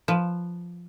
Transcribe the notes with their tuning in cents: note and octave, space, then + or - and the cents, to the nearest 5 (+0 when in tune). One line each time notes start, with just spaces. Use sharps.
F3 +0 B4 +5